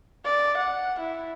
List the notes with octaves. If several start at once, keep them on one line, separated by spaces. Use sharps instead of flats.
D5
F#5
E4